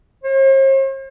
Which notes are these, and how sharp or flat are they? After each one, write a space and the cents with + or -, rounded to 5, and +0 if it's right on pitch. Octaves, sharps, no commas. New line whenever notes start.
C5 +45